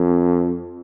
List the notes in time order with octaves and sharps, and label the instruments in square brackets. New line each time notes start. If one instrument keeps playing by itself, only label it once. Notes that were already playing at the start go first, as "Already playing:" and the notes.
Already playing: [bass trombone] F2